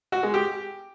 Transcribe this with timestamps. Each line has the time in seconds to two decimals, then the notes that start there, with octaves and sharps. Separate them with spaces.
0.12 F#4
0.23 G#3
0.34 G4